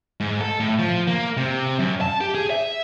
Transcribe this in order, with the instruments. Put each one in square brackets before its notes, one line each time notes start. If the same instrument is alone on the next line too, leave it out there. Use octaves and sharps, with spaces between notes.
[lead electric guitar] G#2
A4
A2
F3
A#3
C3
F#2
A5
G4
G#4
E5